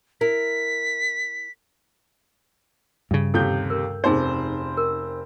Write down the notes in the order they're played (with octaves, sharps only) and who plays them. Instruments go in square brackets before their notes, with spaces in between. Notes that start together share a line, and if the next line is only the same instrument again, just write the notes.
[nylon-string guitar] E4 A#4 [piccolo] B6
[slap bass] G2 C#3
[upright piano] D#2 C3 G6 [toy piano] A4
[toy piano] A#4
[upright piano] F1 C4 C5 [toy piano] C#4 D#4 G#4
[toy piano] A#4